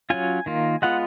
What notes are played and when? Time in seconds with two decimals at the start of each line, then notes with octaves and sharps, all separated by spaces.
0.10 F#3 C#4 F4 G#5
0.46 D#3 A#3 F4
0.82 G#3 B3 F4 F#5